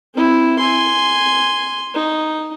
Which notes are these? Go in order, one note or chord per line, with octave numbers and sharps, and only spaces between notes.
C4 E4
G#5 C6
D#4